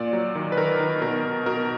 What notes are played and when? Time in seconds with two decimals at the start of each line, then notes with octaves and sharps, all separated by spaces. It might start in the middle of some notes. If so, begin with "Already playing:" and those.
Already playing: A#2 D5
0.13 F#3
0.35 D#3
0.52 B4
0.57 D#3 A#4
0.79 D#3
1.01 B2 A#4
1.24 B2
1.46 B2 A#4